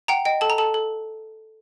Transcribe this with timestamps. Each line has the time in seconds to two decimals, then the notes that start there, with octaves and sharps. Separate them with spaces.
0.08 F#5 G5 A#5
0.25 D#5 G5
0.41 A4 A5
0.50 A#5
0.58 A4 A5
0.74 A4